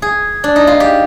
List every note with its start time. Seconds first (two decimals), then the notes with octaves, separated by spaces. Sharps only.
0.02 G#4
0.44 D4
0.56 D#4
0.67 F4
0.80 G4